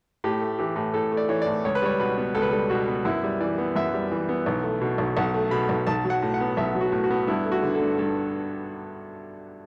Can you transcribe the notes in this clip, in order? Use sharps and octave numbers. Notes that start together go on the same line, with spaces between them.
A2 G4
A3
E3 G4
A2
A2 A4
A3
D5
E3 C#5
D5
A2
C#2 C#5
B4
G3 C#5
B2 B4
B3
C#2 A4
B4
G3 A4
B2 F#4
B3
F#2 E4
G3
E3 D5
B3
F#2 E5
G3
E3
B3
B1
A3
B2
B1
B1 F#5
A3
B2 B5
B1
B1 A5
F#3
F#5
A2
F#5
B3
B1 E5
F#3
F#4
A2
F#4
B3
G2 E4
A3
F#4
D3
A4
G2
G2 A4